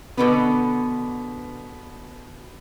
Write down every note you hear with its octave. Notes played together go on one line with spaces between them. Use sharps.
B2 D3 B3 B4